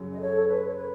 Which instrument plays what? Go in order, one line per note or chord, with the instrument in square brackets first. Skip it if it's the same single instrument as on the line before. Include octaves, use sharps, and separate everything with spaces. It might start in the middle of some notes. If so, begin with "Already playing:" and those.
Already playing: [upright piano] F#2 C#3 F#3
[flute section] D#5
A4 C#5
A4
B4
C#5
B4